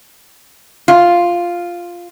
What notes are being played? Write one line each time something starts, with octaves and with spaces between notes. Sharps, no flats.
F4